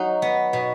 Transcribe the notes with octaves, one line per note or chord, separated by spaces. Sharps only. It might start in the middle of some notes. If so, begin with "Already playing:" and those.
Already playing: F#3 D#4 F#4
B3
B2